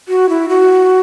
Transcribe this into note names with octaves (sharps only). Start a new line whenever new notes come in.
F#4
E4
F#4